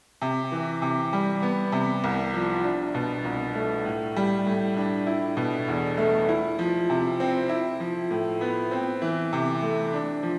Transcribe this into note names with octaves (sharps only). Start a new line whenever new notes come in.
C3
E3
C3
G3
B3
C3
C2
F3
D4
B2
C2
A3
A2
G3
A2
D4
E4
B2
E2
A3
E4
F3
C3
C4
E4
F3
A2
B3
C4
E3
C3
A3
D4
F3